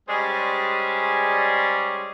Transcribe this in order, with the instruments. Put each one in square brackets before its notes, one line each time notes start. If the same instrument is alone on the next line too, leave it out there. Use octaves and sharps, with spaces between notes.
[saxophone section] G3 G#3 C#4 G#4 C5 D5